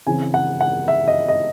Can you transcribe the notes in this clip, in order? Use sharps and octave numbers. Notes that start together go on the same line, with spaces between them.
C#3 E3 C4 G#5
F#5
F#5
E5
D#5
D#5